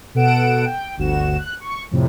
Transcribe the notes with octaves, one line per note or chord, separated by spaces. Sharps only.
B2 A4 F#5 D7 E7
G5
G1 D2 F#4 E7
F#6
C#6
F2 A2 C3